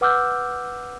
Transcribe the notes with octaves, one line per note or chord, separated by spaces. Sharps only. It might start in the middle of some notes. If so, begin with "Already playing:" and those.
B4 F#5 D6 E6 F6 G6